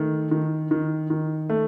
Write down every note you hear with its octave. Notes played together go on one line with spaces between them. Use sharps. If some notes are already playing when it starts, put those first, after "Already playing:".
Already playing: D#3 A3
D#3
D#3
D#3
A3